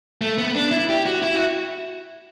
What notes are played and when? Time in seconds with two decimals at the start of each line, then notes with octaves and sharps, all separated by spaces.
0.21 A3
0.38 B3
0.55 D4
0.71 E4
0.89 G4
1.06 F#4
1.23 E4
1.35 F#4